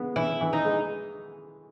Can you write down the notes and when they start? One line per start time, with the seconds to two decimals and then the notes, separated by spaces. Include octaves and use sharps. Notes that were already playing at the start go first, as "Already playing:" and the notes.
Already playing: G#3 B3
0.16 E3 E4
0.41 E3
0.53 D#4
0.65 G#3